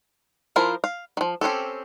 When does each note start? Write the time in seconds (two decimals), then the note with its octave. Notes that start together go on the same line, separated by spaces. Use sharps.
0.56 F3 E4 F4 A#4 C5
0.84 F5
1.17 D#3 F3
1.41 C4 C#4 G4 A4